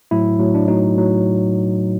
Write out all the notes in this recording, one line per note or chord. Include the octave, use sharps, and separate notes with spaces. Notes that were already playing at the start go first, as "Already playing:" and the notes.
A2 F#3 E4
A2 F#3
D4
A2 F#3 D#4
A2 F#3